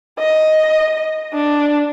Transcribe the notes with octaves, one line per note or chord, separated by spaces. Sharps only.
D#5
D4